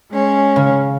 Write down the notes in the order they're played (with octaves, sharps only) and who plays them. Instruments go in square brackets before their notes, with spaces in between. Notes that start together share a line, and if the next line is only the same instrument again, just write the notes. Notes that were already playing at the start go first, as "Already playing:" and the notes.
[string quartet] G#3 C#4
[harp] C#3